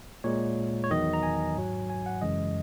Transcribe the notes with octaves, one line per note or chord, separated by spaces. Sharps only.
A#2 G#3 C#5
C#5
E2 D#3 F#3 D#5
A#5
G#5
G#2 F#3
G#5
F#5
F#2 C#3 E3 G#3 D#5